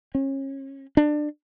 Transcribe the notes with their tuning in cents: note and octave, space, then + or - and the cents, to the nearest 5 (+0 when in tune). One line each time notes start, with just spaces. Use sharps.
C#4 -30
D4 +25